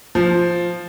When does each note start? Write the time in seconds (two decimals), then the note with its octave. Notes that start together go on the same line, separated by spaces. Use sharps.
0.15 F3